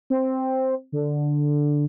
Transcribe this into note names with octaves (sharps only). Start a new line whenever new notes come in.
C4
D3